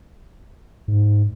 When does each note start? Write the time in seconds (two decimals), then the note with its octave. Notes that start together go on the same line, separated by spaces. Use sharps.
0.88 G#2